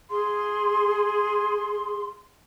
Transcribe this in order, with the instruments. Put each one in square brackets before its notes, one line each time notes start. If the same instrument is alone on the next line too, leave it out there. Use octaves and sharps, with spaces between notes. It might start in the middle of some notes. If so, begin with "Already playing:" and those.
[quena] G#4 [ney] C6